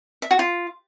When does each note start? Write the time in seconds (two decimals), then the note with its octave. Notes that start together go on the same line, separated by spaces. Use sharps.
0.22 E5
0.31 F#4
0.39 F4